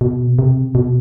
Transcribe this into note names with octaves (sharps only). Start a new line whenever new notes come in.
B2
C3
B2